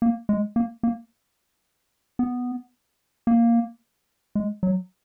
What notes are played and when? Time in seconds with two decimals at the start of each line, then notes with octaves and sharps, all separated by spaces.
0.02 A#3
0.29 G#3
0.56 A#3
0.83 A#3
2.19 B3
3.27 A#3
4.35 G#3
4.63 F#3